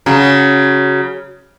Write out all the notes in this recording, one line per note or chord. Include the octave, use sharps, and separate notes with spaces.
C#3 F#3